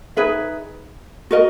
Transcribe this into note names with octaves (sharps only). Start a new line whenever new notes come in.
D#4 G#4 B4 E5
F#4 A#4 D#5